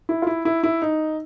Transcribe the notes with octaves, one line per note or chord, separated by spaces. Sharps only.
E4
F4
E4
E4
E4
D#4